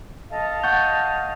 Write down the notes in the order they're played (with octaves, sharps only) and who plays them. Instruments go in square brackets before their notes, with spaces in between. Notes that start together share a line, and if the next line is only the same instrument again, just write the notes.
[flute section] A4 D#5 F5
[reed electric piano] F#5 C#6 G6